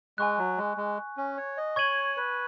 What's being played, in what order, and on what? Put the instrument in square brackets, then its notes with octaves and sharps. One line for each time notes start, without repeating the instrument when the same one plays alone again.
[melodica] G#3 [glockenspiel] G#5 C#6 F#6
[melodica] F#3
G#3
G#3
C#4
C#5
D#5
[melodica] C#5 [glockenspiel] C#6 G#6 D#7 F#7
[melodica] B4